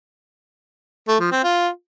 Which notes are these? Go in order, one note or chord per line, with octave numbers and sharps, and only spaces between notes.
A3
F3
C4
F4